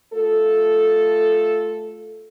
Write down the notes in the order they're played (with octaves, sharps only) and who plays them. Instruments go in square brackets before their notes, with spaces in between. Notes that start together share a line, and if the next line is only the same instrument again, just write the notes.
[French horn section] A3 F4 A4